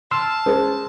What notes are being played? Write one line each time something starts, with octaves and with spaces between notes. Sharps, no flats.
A5 C6 E6 F6
G#3 C#4 B4 C5